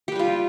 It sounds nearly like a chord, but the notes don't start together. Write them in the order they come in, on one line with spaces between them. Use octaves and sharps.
G4 B4 G3 F4